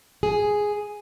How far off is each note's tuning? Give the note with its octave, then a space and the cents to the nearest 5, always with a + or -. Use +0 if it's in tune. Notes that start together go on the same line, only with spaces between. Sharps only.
G#4 +0